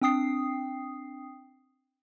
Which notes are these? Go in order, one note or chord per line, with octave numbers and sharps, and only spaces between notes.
C4 D4 G5 D#6 C7